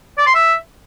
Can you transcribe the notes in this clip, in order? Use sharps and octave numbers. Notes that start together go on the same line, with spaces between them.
D5
C6
E5